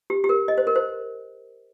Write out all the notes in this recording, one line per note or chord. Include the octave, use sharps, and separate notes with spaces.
G4
G4
A#4
D#5
C5
A#4
C5